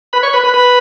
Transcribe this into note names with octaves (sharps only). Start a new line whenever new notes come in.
B4 B5
C#5 C#6
B4 B5
B4 B5
B4 B5